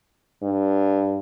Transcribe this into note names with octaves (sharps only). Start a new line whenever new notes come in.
G2